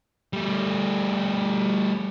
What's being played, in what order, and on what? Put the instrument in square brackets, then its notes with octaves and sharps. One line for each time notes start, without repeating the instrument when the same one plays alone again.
[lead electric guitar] G3 A3